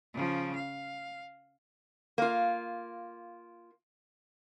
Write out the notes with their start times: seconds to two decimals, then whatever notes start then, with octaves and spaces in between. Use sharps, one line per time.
0.14 C#3 F3
0.55 F5
2.18 A#3 F4